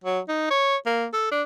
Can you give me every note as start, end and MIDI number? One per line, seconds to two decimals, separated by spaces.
0.04 0.20 54
0.28 0.46 63
0.51 0.77 73
0.86 1.06 58
1.13 1.28 69
1.32 1.43 62